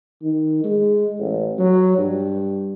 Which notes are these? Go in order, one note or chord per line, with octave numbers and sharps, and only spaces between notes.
D#3
G#3
A1
F#3
G2